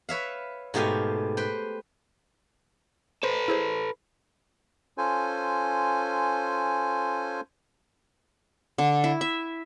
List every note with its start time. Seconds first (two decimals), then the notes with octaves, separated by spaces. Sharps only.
0.09 B4 C#5 E5 F5
0.74 G#2 B2 A3 G4 F5 G#5
1.37 B4 C5 G5
3.23 A4 B4 C5
3.48 E4 G#4 C5
4.98 C#4 F4 A4 C5 G#5
8.78 D3
9.04 E4
9.21 E5